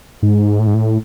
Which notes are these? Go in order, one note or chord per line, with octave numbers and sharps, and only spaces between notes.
G#2
A2
G#2
A2